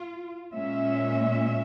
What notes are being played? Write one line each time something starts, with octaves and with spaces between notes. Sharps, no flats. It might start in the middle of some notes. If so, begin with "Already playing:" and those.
Already playing: F4
A#2 G#3 C#4 E5